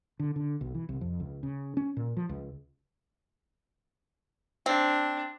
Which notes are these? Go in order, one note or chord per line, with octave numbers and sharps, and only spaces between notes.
D3
D3
B1
E3
C2
F2
C#2
C#3
C#4
A#2
F3
C#2
C4 D4